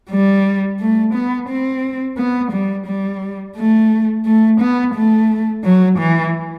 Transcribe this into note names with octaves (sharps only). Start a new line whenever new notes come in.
G3
A3
B3
C4
B3
G3
G3
A3
A3
B3
A3
F#3
E3